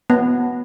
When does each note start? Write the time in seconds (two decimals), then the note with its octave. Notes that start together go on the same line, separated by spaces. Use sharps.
0.10 B3